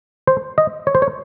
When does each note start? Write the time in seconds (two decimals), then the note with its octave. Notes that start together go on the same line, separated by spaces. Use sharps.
0.27 C5
0.58 D#5
0.87 C#5
0.95 C5
1.02 C#5